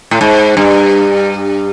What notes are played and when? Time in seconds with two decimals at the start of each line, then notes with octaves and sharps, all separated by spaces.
0.11 A2
0.21 G#2
0.57 G2